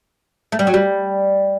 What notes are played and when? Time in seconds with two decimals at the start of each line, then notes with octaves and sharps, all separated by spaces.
0.52 A3
0.59 G3
0.67 F#3
0.74 G3